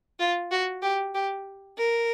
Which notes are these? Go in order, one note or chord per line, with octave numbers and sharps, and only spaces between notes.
F4
F#4
G4
G4
A#4